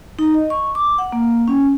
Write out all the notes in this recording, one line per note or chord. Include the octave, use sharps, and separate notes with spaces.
D#4
D#5
C#6
D6
F#5
A#3
C#4